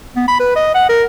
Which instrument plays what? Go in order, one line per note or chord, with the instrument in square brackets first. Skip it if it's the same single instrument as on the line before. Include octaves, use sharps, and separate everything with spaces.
[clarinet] B3
B5
B4
D#5
F#5
A#4